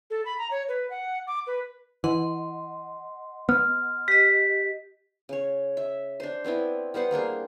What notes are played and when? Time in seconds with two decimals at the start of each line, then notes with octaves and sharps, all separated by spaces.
0.10 A4
0.25 B5
0.38 A#5
0.51 C#5
0.69 B4
0.90 F#5
1.27 D6
1.47 B4
2.04 E3 D#5 F#5 C6
3.49 B3 F6
4.08 G4 D#5 B6
5.29 C#3 C#5
5.77 E5
6.20 D4 C5
6.44 B3 C4 D4 E4
6.94 G3 B3 C5 F#5
7.11 G3 A#3 D4 G#4